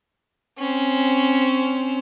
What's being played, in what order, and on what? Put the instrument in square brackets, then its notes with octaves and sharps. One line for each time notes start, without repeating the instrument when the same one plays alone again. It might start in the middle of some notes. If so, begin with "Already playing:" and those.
[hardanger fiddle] C4 C#4